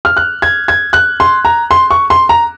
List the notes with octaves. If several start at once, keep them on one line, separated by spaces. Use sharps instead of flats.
F6
F#6
G#6
G#6
F#6
C6
A#5
C6
C#6
C6
A#5